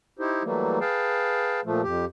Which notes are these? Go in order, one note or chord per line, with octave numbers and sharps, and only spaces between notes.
D#4 E4 G4 C5
E3 F#3 G3 A3 A#3
G#4 B4 F5 G5 A5
A#2 F3 A3
F2 G4